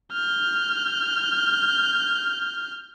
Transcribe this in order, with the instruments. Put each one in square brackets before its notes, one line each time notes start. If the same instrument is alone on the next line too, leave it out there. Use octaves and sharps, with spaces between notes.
[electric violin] F6 G6